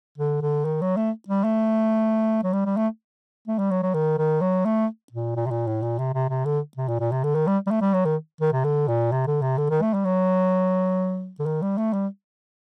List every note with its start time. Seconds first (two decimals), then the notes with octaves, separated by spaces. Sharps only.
0.18 D3
0.42 D3
0.65 D#3
0.81 F#3
0.97 A3
1.28 G3
1.44 A3
2.44 F#3
2.53 G3
2.65 G3
2.77 A3
3.48 A3
3.59 G3
3.71 F#3
3.83 F#3
3.94 D#3
4.18 D#3
4.41 F#3
4.65 A3
5.12 A#2
5.36 A#2
5.46 C3
5.51 A#2
5.67 A2
5.82 A#2
5.98 C3
6.14 C3
6.29 C3
6.45 D3
6.77 C3
6.88 A#2
7.00 A#2
7.12 C3
7.23 D3
7.35 D#3
7.47 G3
7.67 G3
7.71 A3
7.81 G3
7.94 F#3
8.05 D#3
8.41 D#3
8.53 C3
8.64 D3
8.88 A#2
9.12 C3
9.27 D3
9.42 C3
9.58 D3
9.70 D#3
9.82 A3
9.94 G3
10.05 F#3
11.39 D3
11.46 D#3
11.62 G3
11.77 A3
11.93 G3